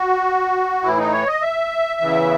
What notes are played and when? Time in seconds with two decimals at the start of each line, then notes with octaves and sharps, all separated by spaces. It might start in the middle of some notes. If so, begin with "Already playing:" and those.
Already playing: F#4
0.83 A2 E3 E4
0.98 D#4
1.12 C#5
1.28 D#5
1.42 E5
2.00 E2 C#3 E3